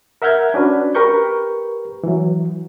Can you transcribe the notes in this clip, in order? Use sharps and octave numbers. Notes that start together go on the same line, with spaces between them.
A#4 E5 F#5 F6 G6 G#6
C#4 D4 F#4 B4
G4 A#4 B4 C#6 G6
E3 F#3